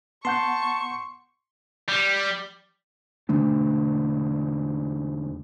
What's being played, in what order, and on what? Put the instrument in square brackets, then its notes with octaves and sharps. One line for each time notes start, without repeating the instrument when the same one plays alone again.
[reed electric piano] B3 F#5 G6 [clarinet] A5 [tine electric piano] C6 [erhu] C#6
[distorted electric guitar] G3
[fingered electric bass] E1 D3 A3 D4